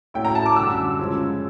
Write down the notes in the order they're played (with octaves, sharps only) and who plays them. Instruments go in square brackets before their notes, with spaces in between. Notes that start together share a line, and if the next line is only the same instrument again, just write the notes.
[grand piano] A2 F#3 A3 C#4 E4 [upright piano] G5
[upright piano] A#5
A5
D6
[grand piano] F#2 D3 G3 [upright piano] E6
[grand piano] C#3 F3 G#3 C#4 F4